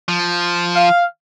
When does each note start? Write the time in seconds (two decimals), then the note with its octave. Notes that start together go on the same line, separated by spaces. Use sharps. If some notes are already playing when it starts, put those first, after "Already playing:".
0.08 F3
0.76 F5